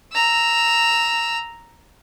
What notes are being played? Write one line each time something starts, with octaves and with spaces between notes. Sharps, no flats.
A#5 E6